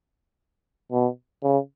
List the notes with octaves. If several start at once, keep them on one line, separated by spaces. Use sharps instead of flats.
B2
C#3